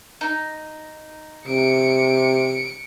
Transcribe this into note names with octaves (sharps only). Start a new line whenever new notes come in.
D#4
C3 C#7 D7